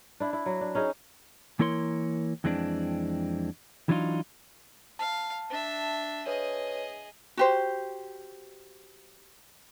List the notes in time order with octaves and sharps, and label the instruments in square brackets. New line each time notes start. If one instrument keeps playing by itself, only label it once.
[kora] D4 E4
E4
F#3
D4
C#4 D#4 G#4
[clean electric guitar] E3 A#3 E4 A#4 C#5 C6
F2 E3 G#3 C4 D4
E3 F#3 D4 D#4 F4
[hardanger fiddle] F5 [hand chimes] A5
[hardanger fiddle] D4 E5
[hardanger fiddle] G#4 D#5 [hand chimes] B4 C#5
[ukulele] F#4 G4 C5